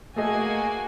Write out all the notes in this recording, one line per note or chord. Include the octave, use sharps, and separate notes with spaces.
A3 A#3 F#4 G#4 D#5 G#5